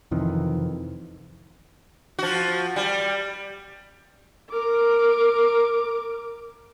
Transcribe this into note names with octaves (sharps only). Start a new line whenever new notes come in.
F2 C3 D#3 E3
F3 F#4
G3
A#4 D6